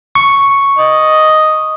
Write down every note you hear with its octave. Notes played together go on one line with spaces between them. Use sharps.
C#6
D#5